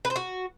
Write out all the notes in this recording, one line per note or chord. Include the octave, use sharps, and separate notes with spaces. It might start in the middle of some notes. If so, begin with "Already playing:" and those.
B4
C5
F#4